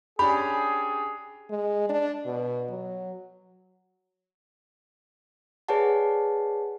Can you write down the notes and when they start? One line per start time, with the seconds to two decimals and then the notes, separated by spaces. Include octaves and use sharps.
0.19 C#4 D4 G4 G#4 B5
1.50 G#3
1.90 D4
2.26 B2
2.70 F#3
5.68 G#4 B4 C#5 D5 F#5 A5